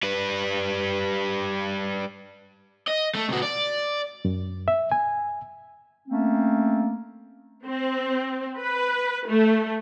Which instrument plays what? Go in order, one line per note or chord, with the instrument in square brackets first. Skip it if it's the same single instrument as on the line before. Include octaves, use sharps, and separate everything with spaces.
[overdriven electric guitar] G3 B4
D#5
A3
C3 F#4
D5
[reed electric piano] F#2
E5
G#5
[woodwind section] A3 A#3 C4 C#4
[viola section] C4
B4
A3